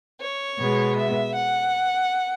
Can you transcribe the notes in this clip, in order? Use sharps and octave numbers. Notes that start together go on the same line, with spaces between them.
C#5
B2 G#3 B3
E5
F#5